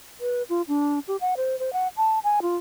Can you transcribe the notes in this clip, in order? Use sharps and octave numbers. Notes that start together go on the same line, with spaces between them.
B4
F4
D4
G4
F#5
C5
C5
F#5
A5
G#5
F4